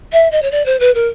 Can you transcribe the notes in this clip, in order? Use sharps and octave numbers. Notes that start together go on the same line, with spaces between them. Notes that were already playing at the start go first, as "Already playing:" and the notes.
E5
D#5
C#5
D5
C5
B4
A#4